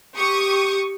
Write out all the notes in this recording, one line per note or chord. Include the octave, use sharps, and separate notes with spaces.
G4 C#6 D#6